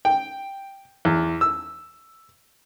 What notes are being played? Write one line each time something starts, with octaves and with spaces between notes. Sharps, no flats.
G5
E2
E6